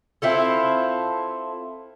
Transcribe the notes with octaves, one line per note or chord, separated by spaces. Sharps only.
C4 E4 F4 A4